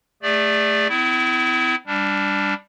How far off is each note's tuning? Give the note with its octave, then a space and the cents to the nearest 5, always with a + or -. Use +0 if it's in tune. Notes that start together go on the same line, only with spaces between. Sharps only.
A3 +0 G#4 -40 D5 +0
C4 -45 E4 +0
G3 +10 D4 -15